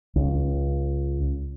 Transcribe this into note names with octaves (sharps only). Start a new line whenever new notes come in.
C#2